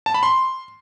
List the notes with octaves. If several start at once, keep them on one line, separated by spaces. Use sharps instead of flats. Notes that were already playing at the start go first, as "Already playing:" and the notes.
A5
B5
C6